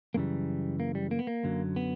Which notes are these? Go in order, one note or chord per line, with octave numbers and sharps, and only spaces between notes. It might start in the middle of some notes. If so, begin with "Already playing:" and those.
F#2 C#3 E3 G3 A#3
A#3
G3
A#3
B3
A#3
F#2 D3 F#3
B3